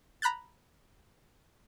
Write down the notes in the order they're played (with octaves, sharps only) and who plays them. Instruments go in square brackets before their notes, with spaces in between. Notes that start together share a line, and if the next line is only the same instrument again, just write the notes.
[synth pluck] A#5 B5 F#6 G6 A6